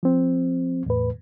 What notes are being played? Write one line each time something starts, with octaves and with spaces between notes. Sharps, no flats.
F3 C4
E2 A2 B4